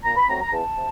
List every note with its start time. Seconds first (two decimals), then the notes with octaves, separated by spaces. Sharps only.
0.04 A#2 A#5
0.17 B5
0.28 F#3 A3 C4 A#5
0.41 A#5
0.51 E2 A5
0.76 C3